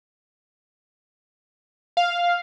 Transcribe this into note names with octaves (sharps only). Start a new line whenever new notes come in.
F5